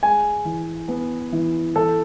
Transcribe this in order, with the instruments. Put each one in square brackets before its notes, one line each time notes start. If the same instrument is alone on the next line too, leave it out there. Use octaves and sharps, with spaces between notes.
[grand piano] G#3 G#5
E3
B3
E3
E3 A4